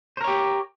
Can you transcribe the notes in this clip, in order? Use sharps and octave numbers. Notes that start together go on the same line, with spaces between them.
G4 A#4 C5 C#5